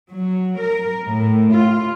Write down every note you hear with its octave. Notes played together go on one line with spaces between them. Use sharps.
F#3
A#4
A2
F4